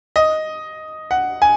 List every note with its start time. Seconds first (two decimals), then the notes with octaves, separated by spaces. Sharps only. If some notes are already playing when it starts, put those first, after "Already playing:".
0.16 D#5
1.11 F#5
1.42 G#5